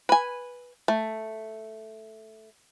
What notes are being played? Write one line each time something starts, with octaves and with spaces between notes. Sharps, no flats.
B4 G#5
A3